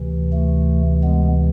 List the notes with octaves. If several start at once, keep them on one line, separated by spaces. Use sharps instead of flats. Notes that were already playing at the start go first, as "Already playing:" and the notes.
Already playing: D2 C3 E3
A3
G#3 B3